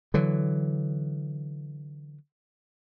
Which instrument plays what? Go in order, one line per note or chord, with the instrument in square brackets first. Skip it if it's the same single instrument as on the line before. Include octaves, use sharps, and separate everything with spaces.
[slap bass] D3 E3 F#3